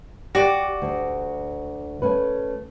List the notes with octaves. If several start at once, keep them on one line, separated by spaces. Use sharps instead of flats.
F#4 G4 D5
D2
A3 C#4 B4